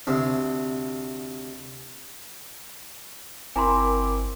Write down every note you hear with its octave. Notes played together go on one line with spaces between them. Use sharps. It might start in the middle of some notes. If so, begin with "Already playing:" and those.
D2 C3
G1 C4 E4 A#4 G#5 A#5 C6 D6